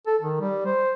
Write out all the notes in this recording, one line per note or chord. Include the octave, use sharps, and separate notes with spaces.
A4
D#3
G3
C5